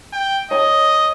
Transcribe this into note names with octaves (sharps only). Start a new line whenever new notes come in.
G5
C#5 D#5